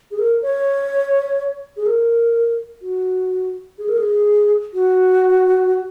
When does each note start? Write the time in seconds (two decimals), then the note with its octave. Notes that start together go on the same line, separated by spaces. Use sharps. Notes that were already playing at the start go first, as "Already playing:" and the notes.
0.11 G#4
0.19 A#4
0.42 C#5
1.77 G#4
1.86 A#4
2.82 F#4
3.78 G#4
3.88 A#4
3.98 G#4
4.74 F#4